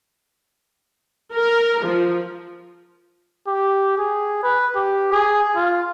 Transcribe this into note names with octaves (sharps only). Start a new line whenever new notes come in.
A#4
F3
G4
G#4
B4
G4
G#4
F4